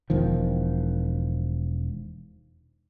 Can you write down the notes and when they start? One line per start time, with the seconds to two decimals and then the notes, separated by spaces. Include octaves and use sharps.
0.10 E1 D#3 F3